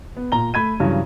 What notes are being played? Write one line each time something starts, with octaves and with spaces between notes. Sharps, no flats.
B3
A#2 A#5 G7
A3 B5 G#6 D#7
G2 C#3 E3 F#3